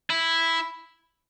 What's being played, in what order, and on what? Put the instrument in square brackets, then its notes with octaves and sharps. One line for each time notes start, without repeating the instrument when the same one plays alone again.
[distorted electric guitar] E4